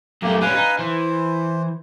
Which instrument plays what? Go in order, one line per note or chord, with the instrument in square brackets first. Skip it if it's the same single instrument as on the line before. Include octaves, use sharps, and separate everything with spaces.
[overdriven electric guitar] F#2 A3 [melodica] A#3 G4
[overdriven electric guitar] G3 C#4 [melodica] B4 F5 G#5
[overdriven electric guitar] D#4
[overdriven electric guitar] E3 [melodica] C5